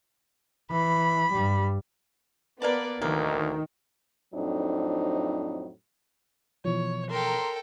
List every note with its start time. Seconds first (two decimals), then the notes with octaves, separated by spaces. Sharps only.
0.71 E3 B5
1.32 G2 G3
2.62 A#3 B3 B4 D5 F5 A5
3.02 D2 D#3 A#3 A#4
4.34 F2 A2 F#3 C4 D4 D#4
6.65 B2 E3 F3 C#5
7.11 A4 A#4 G5 A#5 C6